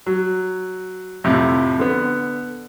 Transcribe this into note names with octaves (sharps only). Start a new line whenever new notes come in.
F#3
F2 A2 C3
D3 B3